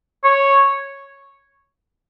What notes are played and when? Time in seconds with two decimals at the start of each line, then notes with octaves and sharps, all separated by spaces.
0.24 C#5